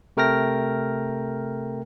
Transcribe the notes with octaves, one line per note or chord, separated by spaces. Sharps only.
C3 A3 A#4 G5 F6 A#6